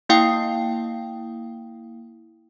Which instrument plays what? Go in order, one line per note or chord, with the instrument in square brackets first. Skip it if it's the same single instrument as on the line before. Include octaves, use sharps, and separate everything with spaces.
[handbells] A#3 E4 F5 G5 D#6 C7